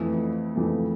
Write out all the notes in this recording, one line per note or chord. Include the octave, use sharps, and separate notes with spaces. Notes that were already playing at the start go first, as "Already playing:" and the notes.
Already playing: F2 E3 A3 E4
F2 E3 A3